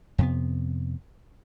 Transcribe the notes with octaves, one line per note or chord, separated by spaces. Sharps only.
F2 C3 B3